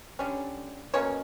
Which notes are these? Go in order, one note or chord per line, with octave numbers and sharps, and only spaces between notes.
D3 G3 C#4
B2 A#3 C#4 C#5